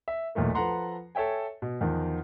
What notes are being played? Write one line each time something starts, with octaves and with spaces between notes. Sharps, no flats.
E5
B1 E2 A#2 A3 A#3
F3 A4 B4 F#5 A#5 C6
A4 C#5 E5 G5 G#5
B2
E2 D#3 F3